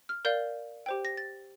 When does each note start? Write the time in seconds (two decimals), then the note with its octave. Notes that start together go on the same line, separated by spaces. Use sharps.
0.09 F6
0.25 A#4 D5 F5 G6
0.86 G4 C5 G5
1.05 A#6
1.17 A6